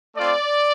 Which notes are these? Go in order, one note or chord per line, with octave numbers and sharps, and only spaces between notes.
A3 C4 F4 D5